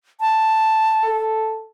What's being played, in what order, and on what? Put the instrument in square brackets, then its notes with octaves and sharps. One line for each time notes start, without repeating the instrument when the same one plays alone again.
[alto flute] A5
[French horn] A4